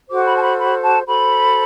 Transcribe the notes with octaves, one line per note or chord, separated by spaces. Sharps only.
F#4 A4 C5 D6
B5
A5
B5
B5
A5
F#4 A4 C5 B5